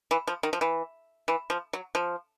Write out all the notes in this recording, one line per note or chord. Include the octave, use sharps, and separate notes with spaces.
E3
F3
D#3
F3
E3
E3
F3
F#3
F3